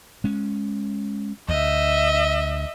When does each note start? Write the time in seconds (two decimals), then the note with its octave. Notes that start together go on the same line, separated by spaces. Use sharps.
0.24 G#3 C#4
1.49 D2 D#5 E5